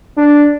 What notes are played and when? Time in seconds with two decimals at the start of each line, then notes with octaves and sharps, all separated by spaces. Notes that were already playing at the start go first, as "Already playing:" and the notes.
0.18 D4